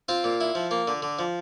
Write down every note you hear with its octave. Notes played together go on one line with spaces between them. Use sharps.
C4 F4
A#2
E4
F3
A#3
D3
D3
F3